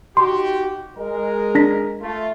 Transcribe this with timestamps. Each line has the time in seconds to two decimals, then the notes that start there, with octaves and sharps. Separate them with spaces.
0.17 D#4 F#4 G4 C6
0.97 G#3 A#4
1.55 D4 A#6 B6
2.02 A3 F4